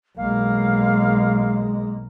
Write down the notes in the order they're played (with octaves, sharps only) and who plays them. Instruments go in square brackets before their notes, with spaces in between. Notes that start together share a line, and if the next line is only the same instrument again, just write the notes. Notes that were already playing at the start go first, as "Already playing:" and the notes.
[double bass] B1 A#3 [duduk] G#3 [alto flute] F5